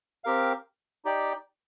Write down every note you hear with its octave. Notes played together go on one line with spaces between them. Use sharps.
C4 G4 A#4 F5
D#4 G4 D5 G5